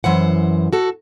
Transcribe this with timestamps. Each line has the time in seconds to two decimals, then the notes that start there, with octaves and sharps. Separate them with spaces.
0.04 F#2 E3 C5 F#5
0.73 F#4 A4